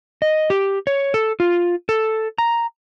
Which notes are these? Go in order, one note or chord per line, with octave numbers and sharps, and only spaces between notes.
D#5
G4
C#5
A4
F4
A4
A#5